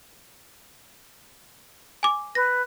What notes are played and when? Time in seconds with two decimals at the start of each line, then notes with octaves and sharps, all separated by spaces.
2.03 G#5 D6
2.35 B4 A#6